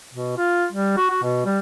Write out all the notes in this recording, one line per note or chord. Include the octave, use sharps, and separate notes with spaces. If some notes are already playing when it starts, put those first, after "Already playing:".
B2
F4
G3
F#4
F#4
B2
G3